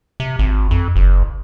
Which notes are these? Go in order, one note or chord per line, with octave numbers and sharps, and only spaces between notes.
C3
G#1
F2
F#1